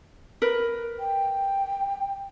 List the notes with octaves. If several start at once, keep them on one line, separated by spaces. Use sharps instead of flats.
A#4 B4
G5